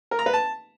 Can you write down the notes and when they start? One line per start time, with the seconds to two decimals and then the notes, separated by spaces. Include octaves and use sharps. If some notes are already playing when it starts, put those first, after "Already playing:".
0.11 A#4
0.19 A#5
0.26 B4
0.33 A5